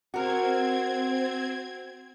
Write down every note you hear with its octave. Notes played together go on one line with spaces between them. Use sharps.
C4 F#4 A#4 G#6